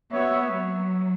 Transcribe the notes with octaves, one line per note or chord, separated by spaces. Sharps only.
B3 F#4 C#5 E5
F#3